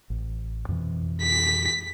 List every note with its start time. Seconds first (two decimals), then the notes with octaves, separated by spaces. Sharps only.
0.10 A1
0.69 F2 B2 E3
1.22 B6